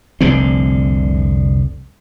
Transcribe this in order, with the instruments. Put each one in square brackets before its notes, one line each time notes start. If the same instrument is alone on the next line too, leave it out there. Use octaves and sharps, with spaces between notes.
[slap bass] F1 C2 D3 C4